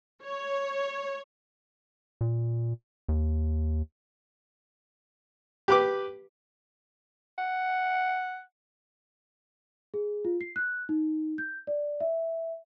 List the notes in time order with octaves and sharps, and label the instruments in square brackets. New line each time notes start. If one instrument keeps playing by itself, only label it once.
[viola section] C#5
[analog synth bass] A#2
D#2
[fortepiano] G4 B4 D6
[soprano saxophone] F#5
[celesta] G#4
F4
C7
F#6
D#4
G6
D5
E5